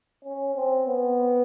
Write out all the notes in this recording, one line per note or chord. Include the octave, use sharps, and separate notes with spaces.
C#4
C4
B3